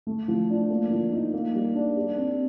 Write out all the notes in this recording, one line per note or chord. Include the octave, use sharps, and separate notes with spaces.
A3
F3
D4
A#3
F3
D#4
A#3
G3
D4
G4
C4